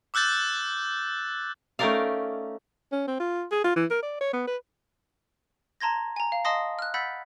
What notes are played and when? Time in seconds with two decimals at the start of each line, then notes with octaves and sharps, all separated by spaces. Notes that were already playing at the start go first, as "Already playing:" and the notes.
0.14 D6 E6 F#6 G6 A6
1.79 A3 C#4 D#4 A#4 D5 F5
2.92 C#4
3.08 C4
3.20 F4
3.51 G#4
3.64 F4
3.76 E3
3.90 A#4
4.03 D5
4.21 C#5
4.33 B3
4.47 B4
5.80 A5 A#5 C6 G#6 A#6
6.16 G#5 A#5
6.32 F5
6.45 D#5 F5 A5 C6 D#6 A#6
6.79 F6 F#6
6.94 F#5 B5 E6 G6 A6 B6